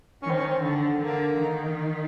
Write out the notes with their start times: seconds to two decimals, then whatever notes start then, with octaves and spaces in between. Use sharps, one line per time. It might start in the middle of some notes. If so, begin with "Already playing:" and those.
0.23 D#3 C#4
0.30 C4
0.38 C#4
0.49 C4
0.61 D3
1.00 D3 A#3
1.39 D#3